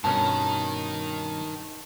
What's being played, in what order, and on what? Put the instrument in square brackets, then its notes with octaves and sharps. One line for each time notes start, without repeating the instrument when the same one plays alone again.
[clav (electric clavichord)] G2 B2 C#4 [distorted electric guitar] D#3 A#4 [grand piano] A5